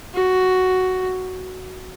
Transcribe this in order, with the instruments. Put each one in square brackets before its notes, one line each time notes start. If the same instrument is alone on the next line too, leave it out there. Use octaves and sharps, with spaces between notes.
[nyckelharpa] F#4